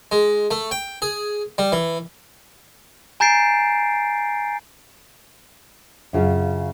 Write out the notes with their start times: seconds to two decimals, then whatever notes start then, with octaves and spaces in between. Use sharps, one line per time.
0.12 G#3
0.51 A3
0.71 G5
1.02 G#4
1.58 G3
1.72 E3
3.20 G#5 A#5 G6 A6 C7 D7
6.13 F#2 C#3 F4